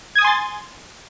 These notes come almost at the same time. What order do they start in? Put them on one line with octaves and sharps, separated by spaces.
G#6 D#6 G#5 C6 A6